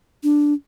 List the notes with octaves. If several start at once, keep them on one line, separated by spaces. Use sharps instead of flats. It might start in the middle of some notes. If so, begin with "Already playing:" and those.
D4